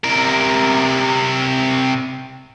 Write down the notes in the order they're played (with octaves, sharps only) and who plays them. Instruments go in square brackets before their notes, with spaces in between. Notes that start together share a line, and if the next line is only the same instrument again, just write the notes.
[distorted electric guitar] C3 A#4